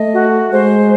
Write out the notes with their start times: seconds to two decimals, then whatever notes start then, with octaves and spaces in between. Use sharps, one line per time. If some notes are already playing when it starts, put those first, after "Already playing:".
Already playing: A3 D#5
0.13 F#4
0.51 G#3 C5